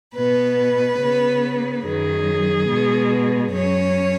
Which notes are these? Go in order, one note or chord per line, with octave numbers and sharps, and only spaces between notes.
B2 B3 B4
C#3 B3
F#2 D#3 F#3 G#4
B2 G#3 B3
F#2 F#3 C#4 C#5